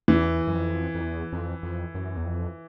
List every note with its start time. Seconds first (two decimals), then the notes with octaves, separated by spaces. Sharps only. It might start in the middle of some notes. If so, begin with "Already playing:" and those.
0.08 E2 E3
0.47 F#2
0.55 F2
0.95 F2
1.01 E2
1.32 F2
1.63 F2
1.95 F#2
2.17 E2
2.25 F2